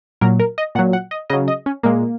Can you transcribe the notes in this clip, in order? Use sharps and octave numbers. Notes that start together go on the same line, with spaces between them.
A#2 F#3 A#4
A#4
D#5
A#2 F#3 F#5
F#5
D#5
C#3 F#3 D#5
D#5
C#4
A#2 G#3 A#3